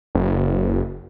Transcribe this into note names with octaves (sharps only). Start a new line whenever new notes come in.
F#1